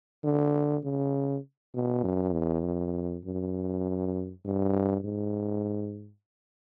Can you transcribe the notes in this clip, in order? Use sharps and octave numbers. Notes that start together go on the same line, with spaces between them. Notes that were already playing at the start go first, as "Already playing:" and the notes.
D3
C#3
B2
F#2
E2
F2
F#2
G2
G#2